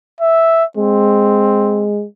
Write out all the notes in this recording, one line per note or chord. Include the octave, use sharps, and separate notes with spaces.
E5
G#3 C4